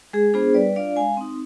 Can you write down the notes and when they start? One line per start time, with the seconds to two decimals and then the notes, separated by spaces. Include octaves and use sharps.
0.13 G#3 G#4
0.34 B3 D4 F4 G#4 C5
0.54 G3 B4 D5
0.76 D4 F4 D5 F5
0.96 G#3 F5 G#5
1.17 C4 D#4